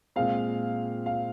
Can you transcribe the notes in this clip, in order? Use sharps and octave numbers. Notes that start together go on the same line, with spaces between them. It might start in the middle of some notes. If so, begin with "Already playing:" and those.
A#2 G#3 C4 F5
F5